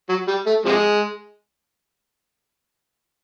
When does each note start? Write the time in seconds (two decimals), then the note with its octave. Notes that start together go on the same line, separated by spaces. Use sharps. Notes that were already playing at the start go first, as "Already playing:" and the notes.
0.09 F#3
0.28 G3
0.47 A3
0.65 C3 F3 G#3